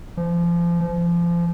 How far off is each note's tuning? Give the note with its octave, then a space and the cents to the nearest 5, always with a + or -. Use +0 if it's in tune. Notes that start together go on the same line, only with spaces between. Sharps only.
F3 -30
F3 -30